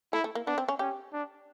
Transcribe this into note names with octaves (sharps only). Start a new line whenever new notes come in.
A3 E4
A3
A#3
B3 D4
C4
C#4
C#4 G4
D4